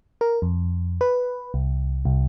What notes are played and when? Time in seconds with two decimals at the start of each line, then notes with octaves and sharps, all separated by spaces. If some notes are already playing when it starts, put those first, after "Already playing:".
0.21 A#4
0.42 F2
1.01 B4
1.54 C2
2.05 C2